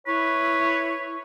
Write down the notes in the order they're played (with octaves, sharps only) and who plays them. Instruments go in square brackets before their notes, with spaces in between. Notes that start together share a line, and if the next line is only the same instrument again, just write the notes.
[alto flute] E4 [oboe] B4 [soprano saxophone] C#5